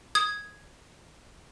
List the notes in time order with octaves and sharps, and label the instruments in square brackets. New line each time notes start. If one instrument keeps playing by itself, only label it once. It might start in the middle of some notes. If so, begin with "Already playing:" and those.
[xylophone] D#6 G#6